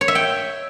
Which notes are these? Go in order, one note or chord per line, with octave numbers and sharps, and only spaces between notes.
C#5
E5
G5